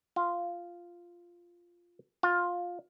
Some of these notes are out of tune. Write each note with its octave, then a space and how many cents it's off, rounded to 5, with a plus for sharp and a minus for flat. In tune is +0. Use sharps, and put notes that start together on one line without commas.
F4 -5
F4 +15